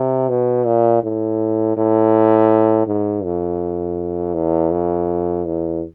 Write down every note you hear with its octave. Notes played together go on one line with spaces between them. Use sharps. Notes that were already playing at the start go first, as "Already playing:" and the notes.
Already playing: C3
B2
A#2
A2
A2
G#2
F2
E2
F2
E2